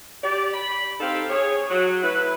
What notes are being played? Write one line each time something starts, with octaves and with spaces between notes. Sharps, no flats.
G4 D5
B5
C4 D#4 G4 A4 F5
G#4 C#5
F#3
A3 E4 B4